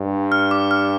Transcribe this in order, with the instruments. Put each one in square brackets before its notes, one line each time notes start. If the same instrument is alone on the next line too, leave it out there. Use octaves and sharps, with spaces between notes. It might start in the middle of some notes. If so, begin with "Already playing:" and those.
Already playing: [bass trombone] G2
[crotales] F6
D6
F6